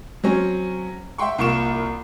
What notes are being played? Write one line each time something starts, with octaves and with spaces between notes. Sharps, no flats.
F#3 C4 C#4
E5 F#5 G5 C6 C#6
C2 A#3 F4 C#6 E7